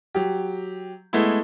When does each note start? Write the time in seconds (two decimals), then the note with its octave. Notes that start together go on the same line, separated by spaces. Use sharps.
0.15 F#3 G4
1.13 G#3 A3 B3 E4